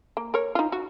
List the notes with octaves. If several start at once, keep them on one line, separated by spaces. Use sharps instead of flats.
A#3
A#4 C#5
D#4 F4
F#4